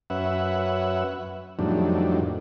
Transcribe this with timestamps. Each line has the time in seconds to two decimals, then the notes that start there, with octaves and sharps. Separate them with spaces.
0.10 F#2 C#4 B4 E5 F#5
1.59 F2 A2 D#3 F#3 G3 D4